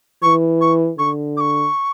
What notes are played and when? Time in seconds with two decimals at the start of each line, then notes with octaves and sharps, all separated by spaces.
0.22 E3 C#6
0.61 C#6
0.98 D3 C#6
1.37 D6
1.40 C#6